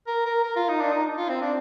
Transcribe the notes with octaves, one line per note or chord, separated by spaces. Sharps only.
A#4
A#4
A#4
F4
D#4
D4
D#4
F4
C4
D4